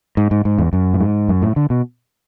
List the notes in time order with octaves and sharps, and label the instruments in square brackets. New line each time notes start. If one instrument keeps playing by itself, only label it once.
[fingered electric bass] G#2
G#2
G#2
E2
F#2
A2
G#2
F#2
A2
D3
B2